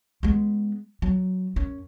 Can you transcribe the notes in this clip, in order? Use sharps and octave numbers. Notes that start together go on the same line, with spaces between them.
G#3 B3
F#3
F#2 C#4